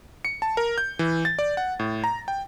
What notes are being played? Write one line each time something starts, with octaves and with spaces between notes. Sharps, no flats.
C#7
A5
A#4
G6
E3
A6
D5
F#5
A2
A#5
G5